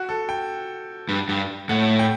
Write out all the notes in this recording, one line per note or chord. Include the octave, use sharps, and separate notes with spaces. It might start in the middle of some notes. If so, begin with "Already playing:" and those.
Already playing: F#4
A4
G5
G2
G2
A2 F#5
G5